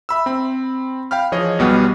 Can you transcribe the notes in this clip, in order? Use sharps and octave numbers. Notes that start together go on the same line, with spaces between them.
E5 B5 E6
C4 B5
F5 G5 B5 F6
E3 F3 G#4 C#5 D#5
B1 B2 G3 B3